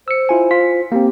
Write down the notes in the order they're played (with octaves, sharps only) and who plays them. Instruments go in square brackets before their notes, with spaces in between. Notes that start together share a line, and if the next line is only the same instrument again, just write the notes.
[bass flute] C5 [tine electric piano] E6 C#7
[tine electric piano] E4 F4 G#5
F4 B6
[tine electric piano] A#3 C4 [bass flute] G4